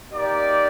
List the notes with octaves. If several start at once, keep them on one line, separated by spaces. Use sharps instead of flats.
A#3 D#4 G4 D5